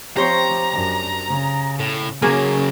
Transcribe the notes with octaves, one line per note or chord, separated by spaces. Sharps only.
F3 C4 G4 C5 C#5 A#5
F#2 D4
C#3
A2
C#3 F#3 A#3 C#4 G#4 A#4